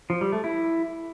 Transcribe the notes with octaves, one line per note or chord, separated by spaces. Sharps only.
F3
G3
A3
E4